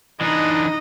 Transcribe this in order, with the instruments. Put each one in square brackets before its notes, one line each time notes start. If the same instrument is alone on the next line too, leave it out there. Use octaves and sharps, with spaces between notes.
[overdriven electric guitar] E3 D4 [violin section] D#4 [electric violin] D#5